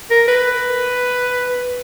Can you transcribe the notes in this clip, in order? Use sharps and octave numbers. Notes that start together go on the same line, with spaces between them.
A#4
B4